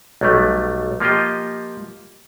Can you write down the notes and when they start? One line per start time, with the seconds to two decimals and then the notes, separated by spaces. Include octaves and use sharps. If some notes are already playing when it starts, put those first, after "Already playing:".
0.21 B1 F#3 G3 A3
1.00 F3 A#3 F4 G4 D#5